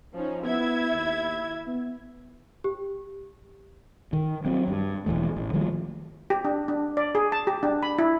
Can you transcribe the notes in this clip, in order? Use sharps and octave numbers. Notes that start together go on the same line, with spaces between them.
F3 C#4 D#4
B3 E4 E5 G#6
D#2
B3
G4
D#3
F#3 C4
G2
E1 B1 E3 A3
A1
D#3 F3 G3 A3
G4
D4
D4
D5
G#4
A5
G4
D4
B5
E4